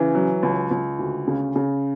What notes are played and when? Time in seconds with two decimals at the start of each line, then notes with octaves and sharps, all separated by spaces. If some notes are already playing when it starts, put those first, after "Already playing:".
Already playing: C#3 E3
0.15 F#3
0.43 C#2
0.71 C#2
0.99 D2
1.28 C#3
1.56 C#3